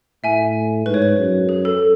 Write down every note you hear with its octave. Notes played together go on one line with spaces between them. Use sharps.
A2 E5 G#5
G#2 B4
C#5
B4
F#2
G#4
A4